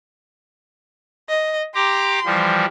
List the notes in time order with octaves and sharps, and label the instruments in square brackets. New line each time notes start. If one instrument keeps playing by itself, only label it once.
[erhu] D#5
[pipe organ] G4 A#5 D6 [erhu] C6
[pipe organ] E3 F3 G3